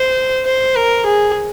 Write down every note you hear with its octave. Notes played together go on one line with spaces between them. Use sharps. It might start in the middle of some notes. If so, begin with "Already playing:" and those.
Already playing: C5
C5
A#4
G#4